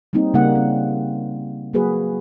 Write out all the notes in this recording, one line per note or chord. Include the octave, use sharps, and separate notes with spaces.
G3 A#3 C4 D#4
C#3 G3 A#3 D#4 F#5
C4
F#3 A#3 F#4 G#4 B4